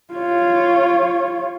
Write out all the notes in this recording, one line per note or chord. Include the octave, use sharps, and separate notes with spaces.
F4 C#5